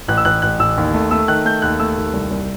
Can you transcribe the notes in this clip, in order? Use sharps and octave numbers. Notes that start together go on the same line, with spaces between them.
A1 F#6
E6
A1 F#6
A1 F#6
A1 E6
D#2
A3
A3 E6
D#3 F#6
A3 G6
D#2 F#6
A3 E6
D#2
C2
C2